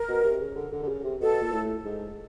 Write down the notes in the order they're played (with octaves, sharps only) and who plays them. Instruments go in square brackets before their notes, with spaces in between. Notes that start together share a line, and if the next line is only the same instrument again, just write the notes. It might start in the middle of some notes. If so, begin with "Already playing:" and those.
Already playing: [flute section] A#4
[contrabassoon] B2
C3
C#3
D3
D3
D3
C#3
C3
[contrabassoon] B2 [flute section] A4
[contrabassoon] A#2
A2
G#2